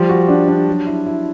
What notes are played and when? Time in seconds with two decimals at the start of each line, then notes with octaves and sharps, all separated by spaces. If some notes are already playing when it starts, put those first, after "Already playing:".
Already playing: F3 G3
0.09 F#4
0.28 D4
0.48 D4
0.68 F#3
0.87 E4
1.06 E4